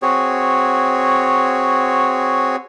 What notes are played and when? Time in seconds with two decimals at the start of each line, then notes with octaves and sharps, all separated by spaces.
0.02 C4 F#4 G#4 C#5